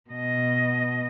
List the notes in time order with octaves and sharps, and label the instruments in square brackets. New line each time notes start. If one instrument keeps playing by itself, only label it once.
[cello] B2 D#5